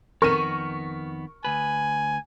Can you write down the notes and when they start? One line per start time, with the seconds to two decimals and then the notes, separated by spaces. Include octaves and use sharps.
0.22 F2 D#3 B3 A#4 C#6 D#7
1.45 D2 B4 G#5